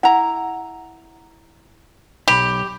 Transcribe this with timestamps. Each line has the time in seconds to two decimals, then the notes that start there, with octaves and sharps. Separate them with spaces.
0.03 E4 F#5 A#5
2.28 B1 G4 B5